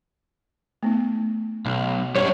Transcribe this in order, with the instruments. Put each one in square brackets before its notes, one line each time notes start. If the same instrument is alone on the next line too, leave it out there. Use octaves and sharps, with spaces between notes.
[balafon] A3 B3 D#4
[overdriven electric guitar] B1
[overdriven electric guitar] F#2 G3 [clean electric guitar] C#5